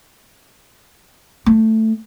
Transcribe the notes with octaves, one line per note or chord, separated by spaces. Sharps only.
A3